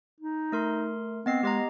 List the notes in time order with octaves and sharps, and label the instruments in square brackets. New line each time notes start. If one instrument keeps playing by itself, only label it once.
[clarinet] D#4
[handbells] A3 A#4 C6
[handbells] B3 D#5 C7 [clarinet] C4
[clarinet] G#3 [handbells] G4 D#5 A#5